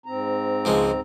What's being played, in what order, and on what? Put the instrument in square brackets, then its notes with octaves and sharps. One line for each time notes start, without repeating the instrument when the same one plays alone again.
[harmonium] G#2 C4 A#5
[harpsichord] C#2 F3 G#3